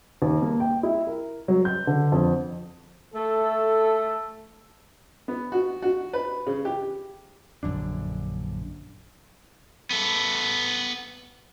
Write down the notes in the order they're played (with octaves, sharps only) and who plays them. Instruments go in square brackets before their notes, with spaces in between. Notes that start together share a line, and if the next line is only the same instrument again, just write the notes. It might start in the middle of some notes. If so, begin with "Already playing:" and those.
[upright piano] D#2
A#3
G5
E4
A#4
F#3
G6
D3
F2
[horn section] A3 A4
[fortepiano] B3
F#4
F#4
B4
C#3
G4
[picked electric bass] A#1 F#2 D3 D4
[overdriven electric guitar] B3 A4